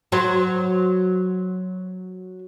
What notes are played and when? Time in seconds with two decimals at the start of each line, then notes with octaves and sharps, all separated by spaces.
0.12 F#3 C5